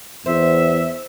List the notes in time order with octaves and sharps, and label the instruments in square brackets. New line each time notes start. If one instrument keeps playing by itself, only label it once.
[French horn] E2 [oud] C5 [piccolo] E5